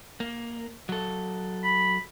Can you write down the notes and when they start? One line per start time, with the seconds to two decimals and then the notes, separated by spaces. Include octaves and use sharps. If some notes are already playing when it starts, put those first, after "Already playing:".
0.20 A#3
0.89 F#3 A4
1.64 B5